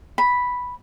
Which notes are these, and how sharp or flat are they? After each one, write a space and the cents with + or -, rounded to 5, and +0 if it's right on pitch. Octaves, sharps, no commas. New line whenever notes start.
B5 -5